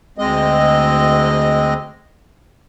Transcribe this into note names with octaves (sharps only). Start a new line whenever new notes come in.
D2 G#3 C4 D#5